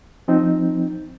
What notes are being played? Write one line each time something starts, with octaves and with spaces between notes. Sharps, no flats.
F3 C4 D#4